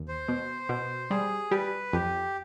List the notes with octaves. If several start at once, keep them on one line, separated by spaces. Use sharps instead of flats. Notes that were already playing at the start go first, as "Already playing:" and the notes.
Already playing: D#2
C5
B2
B2
G3 G#4
G3 B4
F2 G4